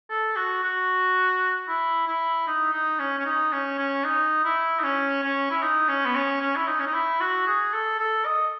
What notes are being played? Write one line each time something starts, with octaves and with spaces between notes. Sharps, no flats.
A4
F#4
F#4
E4
E4
D#4
D#4
C#4
C#4
D#4
C#4
C#4
D#4
E4
D#4
C#4
C#4
E4
D#4
C#4
B3
C#4
C#4
E4
D#4
C#4
D#4
E4
F#4
G#4
A4
A4
D#5